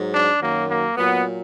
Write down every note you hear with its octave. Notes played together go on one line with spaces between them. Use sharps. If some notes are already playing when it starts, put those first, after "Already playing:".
Already playing: G#2 F#3
D4
F#2 D#3 F#3 A#3
A#3
A#2 F#3 B3